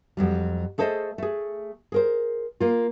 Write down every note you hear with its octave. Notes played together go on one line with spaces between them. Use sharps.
F2 F#3 G3
A3 G#4 A4 C5 D#5
A3 G#4
G#4 A#4 C5
A#3 F4